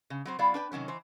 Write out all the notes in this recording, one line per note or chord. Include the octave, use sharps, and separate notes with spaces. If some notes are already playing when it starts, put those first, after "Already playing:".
C#3
F#3 C4 C5
F#3 B3 E4 D5 F5
D4 B4 G5
C3 D#3 F#3 C#4
E3 C5